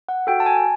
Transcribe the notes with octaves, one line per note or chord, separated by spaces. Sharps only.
F#5
F#4 A4 G5
A5
G#5
G#5